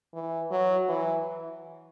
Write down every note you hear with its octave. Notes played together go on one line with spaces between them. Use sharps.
E3
F#3
E3